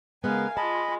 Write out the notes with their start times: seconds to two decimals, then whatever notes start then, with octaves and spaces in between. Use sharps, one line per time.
0.24 C#3 G#3 B3 A#4 B4 F5 G#5
0.57 G#3 F4 D#5 A5 B5